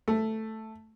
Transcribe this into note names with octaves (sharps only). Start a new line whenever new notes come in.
A3